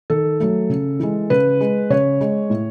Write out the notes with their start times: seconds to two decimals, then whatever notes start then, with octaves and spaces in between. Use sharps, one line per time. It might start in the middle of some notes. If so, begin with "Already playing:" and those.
0.10 D#3 A4
0.40 F#3 A3
0.70 C#3
1.00 E3 G#3
1.30 C#3 B4
1.60 G#3
1.90 C#3 C#5
2.21 G#3
2.50 A2